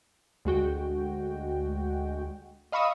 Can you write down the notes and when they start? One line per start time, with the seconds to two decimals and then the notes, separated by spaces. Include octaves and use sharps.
0.45 D2 G#3 F#4 G5
2.72 D#5 F5 B5 C#6 D#6 E6